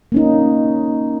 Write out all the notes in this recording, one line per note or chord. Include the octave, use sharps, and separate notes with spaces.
A#3 C#4 D#4